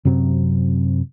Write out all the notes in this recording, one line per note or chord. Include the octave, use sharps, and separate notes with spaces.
F#2 C3 F#3 C4